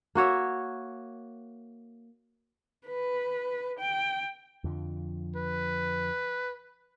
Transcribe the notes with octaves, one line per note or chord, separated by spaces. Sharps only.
A#3 F#4 C#5 E5
B4
G5
F2 D3 F3
B4